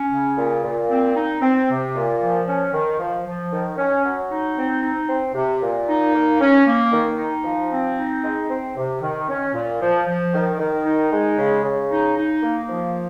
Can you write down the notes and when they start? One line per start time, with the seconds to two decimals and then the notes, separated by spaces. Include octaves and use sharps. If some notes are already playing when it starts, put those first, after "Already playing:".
Already playing: C#4
0.11 C#3
0.37 A#2
0.64 A#2
0.90 C4
1.16 D#4
1.42 C4
1.69 C3
1.95 A#2
2.21 F3
2.47 C#4
2.73 D#3
2.99 F3
3.26 F3
3.51 D#3
3.78 C#4
4.05 F#3
4.31 D#4
4.56 C4
4.82 D#4
5.09 C4
5.35 C3
5.62 A#2
5.88 D#4
6.13 A#3
6.41 C#4
6.66 A#3
6.92 D#3
7.18 D#4
7.44 F3
7.71 C4
7.97 D#4
8.24 G#3
8.49 C4
8.77 C3
9.02 D#3
9.29 C#4
9.54 A#2
9.81 F3
10.06 F3
10.34 D#3
10.59 D#3
10.85 D#4
11.11 G#3
11.38 C#3
11.64 C#3
11.90 D#4
12.17 D#4
12.42 A#3
12.69 F3